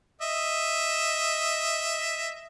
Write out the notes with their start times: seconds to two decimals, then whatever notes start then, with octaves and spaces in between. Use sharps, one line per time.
0.22 D#5 E5